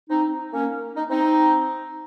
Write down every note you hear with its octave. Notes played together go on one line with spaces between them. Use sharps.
C4 D#4
A#3 C#4
D#4
C4 D#4